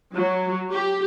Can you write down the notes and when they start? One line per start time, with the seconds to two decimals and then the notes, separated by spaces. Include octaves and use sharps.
0.16 F#3
0.71 G4